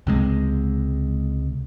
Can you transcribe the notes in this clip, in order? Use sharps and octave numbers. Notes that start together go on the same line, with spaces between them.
C#2 C3 G#3